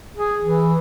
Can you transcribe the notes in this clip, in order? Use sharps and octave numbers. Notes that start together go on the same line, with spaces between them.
G#4
E3